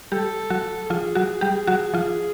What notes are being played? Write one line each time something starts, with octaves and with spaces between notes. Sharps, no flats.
G3 G4 A4
F#3 F#4
F3 F4 G#4
F#3 F#4
G3 G4
F#3 F#4
F3 F4